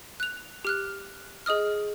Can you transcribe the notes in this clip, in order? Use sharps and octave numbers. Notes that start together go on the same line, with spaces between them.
F#6 F7
G4 F6 F#6
G#4 D#5 D#6 F6